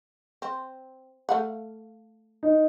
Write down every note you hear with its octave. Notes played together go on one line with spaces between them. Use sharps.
C4
A3 F5 F#5
D#4